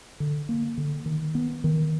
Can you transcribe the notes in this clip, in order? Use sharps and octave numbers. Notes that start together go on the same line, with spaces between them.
D3
A#3
D3
D#3
B3
D#3